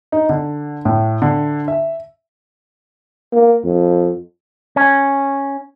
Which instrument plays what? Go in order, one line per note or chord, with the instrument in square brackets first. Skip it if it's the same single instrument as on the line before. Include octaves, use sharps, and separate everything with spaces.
[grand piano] D#4
D3
A2
D3
E5
[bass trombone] A#3
F2
[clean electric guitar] C#4